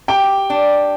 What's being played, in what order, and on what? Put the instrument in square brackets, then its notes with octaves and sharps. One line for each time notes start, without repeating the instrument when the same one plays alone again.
[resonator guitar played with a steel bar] G4 [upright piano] G5
[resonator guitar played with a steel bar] D4